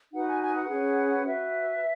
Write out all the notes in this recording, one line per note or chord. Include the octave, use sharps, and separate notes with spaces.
D#4 F#4 B4 F#5
G#5
G#5
F#5
C#4 G#4 B4
F#4 B4 E5